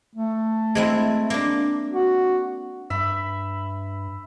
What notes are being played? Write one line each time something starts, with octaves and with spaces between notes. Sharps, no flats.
A3
G#3 C4 E4
A#3 D4
F#4
G2 E5 B5